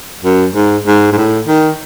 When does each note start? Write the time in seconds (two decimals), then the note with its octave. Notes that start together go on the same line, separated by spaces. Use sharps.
0.24 F#2
0.55 G#2
0.87 G#2
1.12 G#2
1.17 A2
1.47 D#3